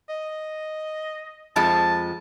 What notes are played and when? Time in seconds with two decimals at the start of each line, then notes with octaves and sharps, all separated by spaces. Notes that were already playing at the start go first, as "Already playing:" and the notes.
0.09 D#5
1.56 F2 F3 G#3 A5